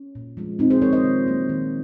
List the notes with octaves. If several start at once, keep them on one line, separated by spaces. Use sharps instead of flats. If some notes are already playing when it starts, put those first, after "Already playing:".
Already playing: C#4
A#2
F3 G#3
A#2 C4 D#4
G#4 C5
F3 G#3 A#4 C#5
C5 D#5
D#3
F#3 A#3
D#3